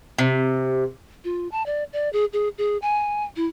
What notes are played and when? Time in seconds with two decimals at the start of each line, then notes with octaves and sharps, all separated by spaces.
0.18 C3
1.24 F4
1.52 A5
1.66 D5
1.93 D5
2.13 G#4
2.33 G#4
2.58 G#4
2.82 G#5
3.36 E4